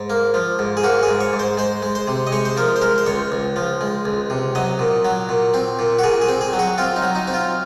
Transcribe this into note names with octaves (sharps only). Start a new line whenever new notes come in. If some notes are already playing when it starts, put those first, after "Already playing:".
Already playing: G#2
A#3
F3
G#2
G#4
A#3 F#4
G#4
G#2
C#5
G#2
C5
G#3 C5
G#3
C5
C3
D#5
G#3 C#5
C5
F3 A#4
C5
G#3 A#4
C5
C#2 C#5
C#2
F3
G#3
C#2
C3
F#3 D#5
A#2
F#3
A#2
C4
A#2
F#4
A#2 G#4
G#4
C4
G#4
F#3
F#4
C4 F4
D#4
F#3
D#4
C4
F4